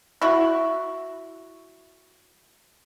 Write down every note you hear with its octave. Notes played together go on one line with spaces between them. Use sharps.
E4 F#4